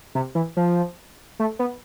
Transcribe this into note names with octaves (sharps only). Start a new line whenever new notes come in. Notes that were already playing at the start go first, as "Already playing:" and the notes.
C3
E3
F3
A3
B3